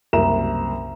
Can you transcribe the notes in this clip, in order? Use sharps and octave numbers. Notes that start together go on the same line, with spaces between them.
F#1 C2 A#4 A#5 E7